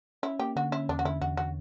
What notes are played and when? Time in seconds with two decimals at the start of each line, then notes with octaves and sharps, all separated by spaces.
0.23 C#4 E4
0.39 A#3 G4
0.56 D3 F#4
0.72 C#4 E4
0.89 E2 D4
0.99 F#4
1.05 D3 E4
1.21 E2 F#4
1.37 D3 F#4